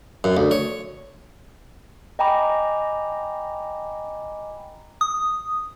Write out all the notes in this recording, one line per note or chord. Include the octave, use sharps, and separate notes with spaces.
F#2
D2
C#5
D#5 G5 G#5 A#5 B5 D6
D#6